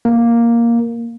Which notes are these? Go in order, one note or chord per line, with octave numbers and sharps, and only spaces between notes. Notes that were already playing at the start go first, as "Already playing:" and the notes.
A#3